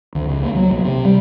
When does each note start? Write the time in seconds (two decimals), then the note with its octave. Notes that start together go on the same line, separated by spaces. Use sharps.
0.15 D2
0.29 C#2
0.43 A#3
0.55 F#3
0.71 B1
0.85 C3
1.05 G3